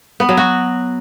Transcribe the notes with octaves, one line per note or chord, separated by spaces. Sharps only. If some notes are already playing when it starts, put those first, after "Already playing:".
B3
F#3
F#4